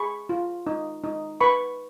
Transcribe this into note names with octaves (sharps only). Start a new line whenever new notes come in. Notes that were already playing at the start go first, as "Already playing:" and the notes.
Already playing: G#4 B5 C#6
F4
D#4
D#4
B4 B5 C#6